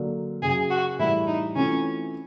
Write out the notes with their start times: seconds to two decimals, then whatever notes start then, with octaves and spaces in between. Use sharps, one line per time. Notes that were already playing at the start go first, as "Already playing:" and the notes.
Already playing: D3 F#3 A#3
0.42 F#2 C#3 F#3 G#4
0.70 F#4
0.99 A2 E3 G3 E4
1.27 D#4
1.56 E3 A3 C4 C#4 F4